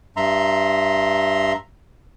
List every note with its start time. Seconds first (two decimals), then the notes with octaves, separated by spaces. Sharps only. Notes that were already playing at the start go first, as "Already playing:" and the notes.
0.17 G2 E5 A#5 C6